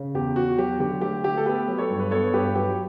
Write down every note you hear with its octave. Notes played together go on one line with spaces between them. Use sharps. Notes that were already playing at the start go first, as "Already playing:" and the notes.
Already playing: C#3
E2 G4
E2 F#4
F#3 G4
D3 G4
A3 G4
A3 G4
A4
B3 G4 B4
F#3
A4 C#5
G2
B4
B3 A4 C#5
G2 G4 B4
F#3 G4